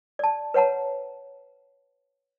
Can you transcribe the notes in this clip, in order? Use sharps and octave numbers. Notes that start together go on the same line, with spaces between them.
D5 A5
B4 C#5 F#5 A5 A#5